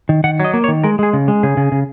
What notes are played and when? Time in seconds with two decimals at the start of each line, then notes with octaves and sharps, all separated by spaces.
0.09 D#3
0.24 D#3 F#5
0.40 F#3 D#5
0.54 A#3
0.64 C#5
0.68 D#3
0.84 G#3 A#4
0.99 G#3 G#4
1.13 C#3
1.28 G#3
1.43 C#3 G#4
1.57 C#3
1.72 C#3